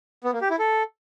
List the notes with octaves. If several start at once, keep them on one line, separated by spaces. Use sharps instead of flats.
B3
A#3
G4
E4
A4